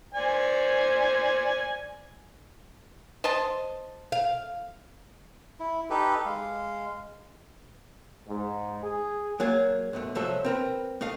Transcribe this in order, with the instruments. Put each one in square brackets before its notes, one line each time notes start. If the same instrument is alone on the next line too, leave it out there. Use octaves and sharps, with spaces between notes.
[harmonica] C5 D5 G#5
[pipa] C5 D#5 A5
[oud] F5
[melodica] E4
D#4 G4 A4 B4
G#3 F5
[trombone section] G#2
G#4
[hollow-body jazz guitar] F#3 A#3 G#4 D5
G#2 B2 A3
C2 F3 F#3 A4 E5
C4 A#4 B4
A3 D#5 F5